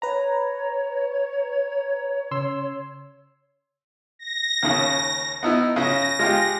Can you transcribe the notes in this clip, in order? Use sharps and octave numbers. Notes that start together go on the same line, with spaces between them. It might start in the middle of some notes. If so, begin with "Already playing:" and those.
B4 C#5 A#5
C#3 C6 E6
A#6
D#2 C#3
B3 D#4 E4
C#3 A#6
G#3 F4 G4